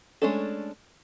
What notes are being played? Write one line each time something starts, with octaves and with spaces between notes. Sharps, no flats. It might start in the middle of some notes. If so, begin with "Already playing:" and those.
G#3 A3 C#4 D4 A4